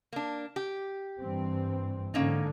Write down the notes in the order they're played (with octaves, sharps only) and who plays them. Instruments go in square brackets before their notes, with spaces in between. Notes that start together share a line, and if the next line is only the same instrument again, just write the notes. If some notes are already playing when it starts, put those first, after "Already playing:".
[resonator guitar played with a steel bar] A#3 D4
G4
[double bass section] G2 E3 C4
[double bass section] G#2 D3 [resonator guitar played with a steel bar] A#3 C#4 D#4